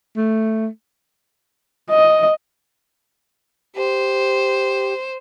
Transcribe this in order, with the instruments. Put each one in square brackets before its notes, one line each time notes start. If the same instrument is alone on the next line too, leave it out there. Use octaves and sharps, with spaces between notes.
[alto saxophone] A3
[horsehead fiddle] D#5
[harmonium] G4 [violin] C5